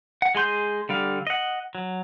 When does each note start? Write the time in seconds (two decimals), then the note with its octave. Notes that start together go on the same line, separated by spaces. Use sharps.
0.22 F#5
0.35 G#3 G#4 C6 G6
0.89 D3 G3 F5
1.27 D#5 F#5
1.75 F#3